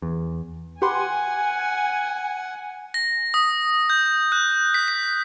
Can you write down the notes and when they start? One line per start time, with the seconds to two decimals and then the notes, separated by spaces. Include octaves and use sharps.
0.02 E2
0.82 G4 B4 F#5 G#5 C6
2.94 A#6
3.34 D#6
3.90 G6
4.32 F#6
4.74 B6
4.88 B6